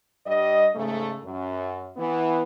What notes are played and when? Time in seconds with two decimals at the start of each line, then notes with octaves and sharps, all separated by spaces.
0.25 G2 G3 D#5
0.74 G#2 C#3 A3
1.23 F#2
1.97 E3 B3